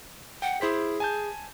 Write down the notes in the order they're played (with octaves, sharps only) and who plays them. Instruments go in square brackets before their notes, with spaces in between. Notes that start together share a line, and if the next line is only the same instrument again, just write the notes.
[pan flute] F#5 [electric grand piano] G5
[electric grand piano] E4 C5 B6 [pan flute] G#4
[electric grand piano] G#5 A5 G6